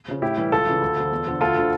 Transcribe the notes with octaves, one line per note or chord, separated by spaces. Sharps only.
C#3 F3
A2 E4 G4
E3 G3
C#2 F4 A4
C#3 E3
D2
D3 F3
E2
D3 F3
D2 F4 A4
D3 F3